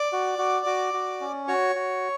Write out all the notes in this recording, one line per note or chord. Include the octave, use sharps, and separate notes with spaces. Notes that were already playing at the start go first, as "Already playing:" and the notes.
Already playing: D5 D6
F#4
F#4
F#4
F#4
C#4
F#4 C#5 C#6
F#4